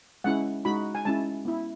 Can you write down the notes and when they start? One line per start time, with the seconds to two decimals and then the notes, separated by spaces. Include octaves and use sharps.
0.24 G#3 C#4 E4 F#5
0.65 G#3 D#4 F#4 B5
0.95 G#5
1.05 G#3 C#4 E4 A5
1.45 B3 E4